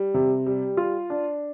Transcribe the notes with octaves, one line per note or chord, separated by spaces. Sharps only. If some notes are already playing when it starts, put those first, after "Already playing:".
Already playing: G3
C3
G3
F4
D4